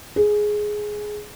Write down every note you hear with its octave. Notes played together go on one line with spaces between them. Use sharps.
G#4